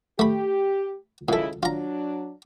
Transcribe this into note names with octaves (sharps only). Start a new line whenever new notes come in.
A3 G4 B5
A#2 C#3 G#3 E4 A4
F#3 D4 F4 A#5